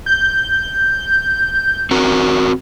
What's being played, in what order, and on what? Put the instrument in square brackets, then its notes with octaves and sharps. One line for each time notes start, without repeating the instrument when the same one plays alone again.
[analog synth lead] G6
[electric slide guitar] C4 F#4 A#4